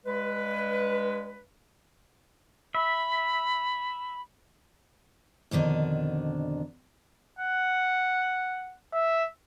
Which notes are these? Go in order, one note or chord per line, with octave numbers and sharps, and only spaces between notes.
G2 G#3 B4
E5 B5
F2 B2 D3 D#3 D4
F#5
E5